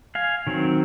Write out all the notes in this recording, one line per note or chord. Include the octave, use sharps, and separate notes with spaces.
F5 G#5
D#3 F#3 C4